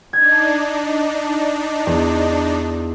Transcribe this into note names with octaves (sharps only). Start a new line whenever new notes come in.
D4 D#4 G#6
E2